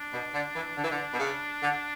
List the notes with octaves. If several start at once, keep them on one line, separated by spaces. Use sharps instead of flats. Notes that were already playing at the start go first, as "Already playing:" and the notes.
Already playing: D4
B2
D3
E3
D3
E3
D3
B2
C#3
D3